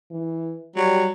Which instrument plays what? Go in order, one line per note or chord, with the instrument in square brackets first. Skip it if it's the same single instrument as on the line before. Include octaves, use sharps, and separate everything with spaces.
[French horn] E3
[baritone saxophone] F#3 [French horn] G3